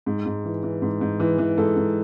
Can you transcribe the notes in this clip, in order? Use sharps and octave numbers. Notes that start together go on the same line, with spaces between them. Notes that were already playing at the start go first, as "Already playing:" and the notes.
G#2
G#2
E3
E3
G#2
G#2
E3
E3
G#2 A4
G#2